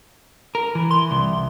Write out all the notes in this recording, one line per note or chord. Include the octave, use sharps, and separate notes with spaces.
A#4
E3
C6
C2